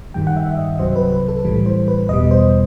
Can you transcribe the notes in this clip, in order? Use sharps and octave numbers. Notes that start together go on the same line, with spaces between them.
G2 D#3 G3 G5
F#5
E5
E5
D#5
D#5
C2 C3 F#3 C5
B4
B4
A4
A2 E3 G3
C5
B4
E2 B2 G3 D#5
C5